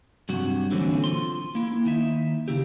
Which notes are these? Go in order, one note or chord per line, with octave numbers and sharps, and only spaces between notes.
G2 C3 F#3 F#4
A#2 D3 E3 F#3 C4 C#4
F4 C6
A#3 E4
D#2 D#4 E5
C#3 E4 G4